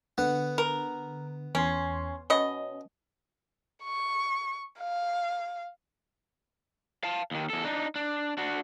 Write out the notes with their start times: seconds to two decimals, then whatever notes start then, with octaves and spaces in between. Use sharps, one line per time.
0.18 D3 B3 F#5
0.58 A#4
1.55 E2 C#4 G#5 C6
2.30 B2 C#4 D#5
3.83 C#6
4.80 F5
7.04 F5 A5
7.31 D#2 D#3
7.50 E2 A4
7.64 D4 D#4
7.96 D4
8.37 D4 F#4